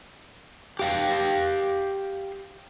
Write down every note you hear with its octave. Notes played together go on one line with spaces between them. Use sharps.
G4 F5 G5